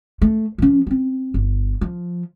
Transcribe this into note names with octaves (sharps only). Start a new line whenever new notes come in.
A3
F3 C#4
B3 C4
G1
F3